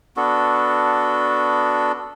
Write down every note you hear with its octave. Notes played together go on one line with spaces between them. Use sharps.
B3 D4 F#4 A4